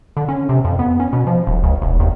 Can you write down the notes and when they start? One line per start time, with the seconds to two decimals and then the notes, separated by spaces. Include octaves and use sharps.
0.17 D3
0.29 C#4
0.49 C3
0.65 F2
0.79 B3
1.00 C#4
1.13 B2
1.27 F3
1.47 D#1
1.63 C#2
1.82 E1
2.00 D#2